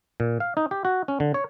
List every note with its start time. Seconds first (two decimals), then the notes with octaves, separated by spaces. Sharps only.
0.20 A#2
0.40 F5
0.57 D#4
0.71 G4
0.85 F#4
1.08 C#4
1.20 D3
1.34 C#5